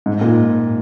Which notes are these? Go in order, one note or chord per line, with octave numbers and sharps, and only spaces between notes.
G#2
A#2